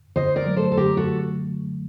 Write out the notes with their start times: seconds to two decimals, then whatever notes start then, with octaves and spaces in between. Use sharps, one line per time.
0.16 D3 C5 D#5
0.36 A#4 D5
0.46 F#3 A3
0.57 A4 C5
0.72 A4
0.77 D3 G4 A#4
0.97 F#4 A4